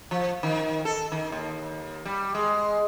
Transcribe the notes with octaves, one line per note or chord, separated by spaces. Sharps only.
F3
D#3
A4
D#3
D#2
G3
G#3